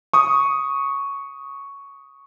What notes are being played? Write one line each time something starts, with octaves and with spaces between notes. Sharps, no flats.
C#6 D#6